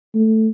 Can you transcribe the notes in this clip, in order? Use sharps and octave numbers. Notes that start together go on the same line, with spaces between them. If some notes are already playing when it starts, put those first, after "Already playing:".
A3